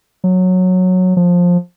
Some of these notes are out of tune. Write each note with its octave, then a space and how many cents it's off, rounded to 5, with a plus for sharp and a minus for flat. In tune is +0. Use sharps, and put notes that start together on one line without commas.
F#3 -10
F3 +15